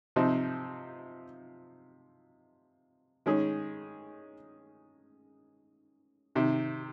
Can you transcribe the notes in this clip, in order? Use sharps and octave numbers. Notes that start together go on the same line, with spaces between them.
C3 F3 C4 D#4
D#3 G#3 C#4 G#4
C3 D#3